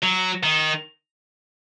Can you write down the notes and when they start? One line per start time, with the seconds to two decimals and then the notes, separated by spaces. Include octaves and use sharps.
0.03 F#3
0.43 D#3